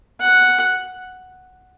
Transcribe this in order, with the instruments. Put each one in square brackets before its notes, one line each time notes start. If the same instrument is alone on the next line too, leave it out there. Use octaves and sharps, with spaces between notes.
[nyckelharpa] F#5